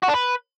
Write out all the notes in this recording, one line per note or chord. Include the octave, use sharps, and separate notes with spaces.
F#4
D4
B4